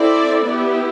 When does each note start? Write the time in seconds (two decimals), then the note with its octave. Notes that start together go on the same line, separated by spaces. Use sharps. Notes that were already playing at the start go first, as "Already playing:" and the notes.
Already playing: C4 E4 A4 D5
0.47 B3 E4 G4